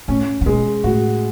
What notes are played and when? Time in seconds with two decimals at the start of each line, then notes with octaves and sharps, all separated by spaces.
0.08 A2 C#4
0.41 A2
0.46 B2 G#3
0.84 A2 F#4